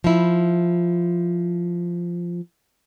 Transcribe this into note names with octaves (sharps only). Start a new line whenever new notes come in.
F3 E4